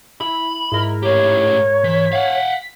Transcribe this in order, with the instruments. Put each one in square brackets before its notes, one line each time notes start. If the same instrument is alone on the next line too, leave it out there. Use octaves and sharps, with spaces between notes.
[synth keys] E4 [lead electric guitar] B5
[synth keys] G#2 A#4 [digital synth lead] E4
[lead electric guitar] A2 G4 [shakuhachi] C#5
[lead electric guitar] E3 [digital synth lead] B6
[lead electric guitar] F5 F#5